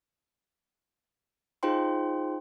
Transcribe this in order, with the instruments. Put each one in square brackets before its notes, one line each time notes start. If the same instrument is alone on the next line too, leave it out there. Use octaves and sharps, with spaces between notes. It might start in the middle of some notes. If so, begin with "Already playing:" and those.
[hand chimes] D#4 F4 G#4 C5 G5 C6